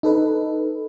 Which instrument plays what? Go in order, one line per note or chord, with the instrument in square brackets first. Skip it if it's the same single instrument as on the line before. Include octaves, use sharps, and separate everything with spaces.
[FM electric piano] D#4 A4 B4